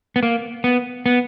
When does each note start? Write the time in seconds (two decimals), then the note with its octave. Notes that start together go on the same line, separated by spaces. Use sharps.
0.16 B3
0.23 A#3
0.64 B3
1.06 B3